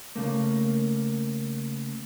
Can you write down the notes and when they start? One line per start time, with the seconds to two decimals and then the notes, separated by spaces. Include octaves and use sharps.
0.16 C#3 A3 A#3